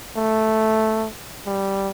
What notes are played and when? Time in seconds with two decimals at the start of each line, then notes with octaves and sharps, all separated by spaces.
0.17 A3
1.47 G3